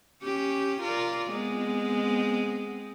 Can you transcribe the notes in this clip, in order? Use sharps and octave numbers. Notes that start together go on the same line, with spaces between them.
C#4 G4
F4 A#4 D5
G#3 B3 C4